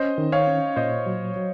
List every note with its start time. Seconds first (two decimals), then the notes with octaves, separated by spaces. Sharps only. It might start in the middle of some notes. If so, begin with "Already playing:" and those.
Already playing: C#4 C5 D#5
0.18 D#3
0.32 C#5 F5
0.47 C#4
0.76 A#2 C5 D#5
1.06 F#3
1.36 F#3